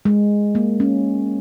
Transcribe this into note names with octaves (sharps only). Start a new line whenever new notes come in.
G#3
A#3
C#4